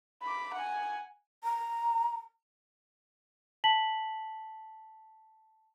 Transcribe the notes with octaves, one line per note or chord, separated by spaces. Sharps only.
B5 D6
F#5 G#5
A#5
A5 B6 F#7